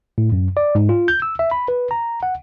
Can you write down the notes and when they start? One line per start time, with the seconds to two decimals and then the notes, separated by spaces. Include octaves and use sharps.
0.18 A2
0.32 F#2
0.57 D5
0.75 G#2
0.89 F4
1.08 G6
1.22 E6
1.39 E5
1.51 B5
1.68 B4
1.91 A#5
2.23 F#5